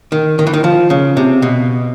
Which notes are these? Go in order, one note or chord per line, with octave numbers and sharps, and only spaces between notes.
D#3
D#3
E3
D#3
F3
C#3
C3
B2